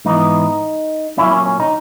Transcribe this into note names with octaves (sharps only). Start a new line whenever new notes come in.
G#2 E3 B3 D#4
A#2 F#3 A#3 C#4 E4
C#4
C#4
D#4